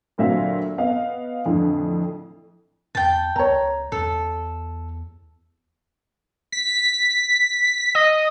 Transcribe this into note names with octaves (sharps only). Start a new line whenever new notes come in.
D2 A#2 F#3 C4 E5 F5
B3 D#5 F5
F2 A2 D3 E3
E2 G5 A5
C#2 C#5 A#5
E2 A4
B6
D#5